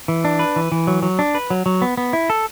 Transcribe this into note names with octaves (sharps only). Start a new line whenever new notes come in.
E3
D4
B4
E3
E3
F#3
F#3
D4
B4
F#3
F#3
B3
B3
E4
A4